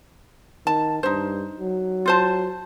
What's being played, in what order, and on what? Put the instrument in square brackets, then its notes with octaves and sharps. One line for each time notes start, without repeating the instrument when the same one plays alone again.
[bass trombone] D#3 [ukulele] A5
[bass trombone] G2 [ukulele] D#4 C5
[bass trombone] F#3
[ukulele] F4 C5 A5